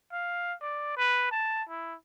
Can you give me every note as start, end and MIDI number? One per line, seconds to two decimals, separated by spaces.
0.12 0.54 77
0.61 0.94 74
0.97 1.27 71
1.31 1.63 81
1.69 1.95 64